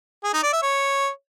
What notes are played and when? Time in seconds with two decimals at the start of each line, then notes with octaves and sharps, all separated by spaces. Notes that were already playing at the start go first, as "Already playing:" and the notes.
0.24 G#4
0.34 D#4
0.43 D5
0.53 E5
0.63 C#5